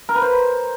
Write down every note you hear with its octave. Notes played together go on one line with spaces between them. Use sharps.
A#4
B4
C5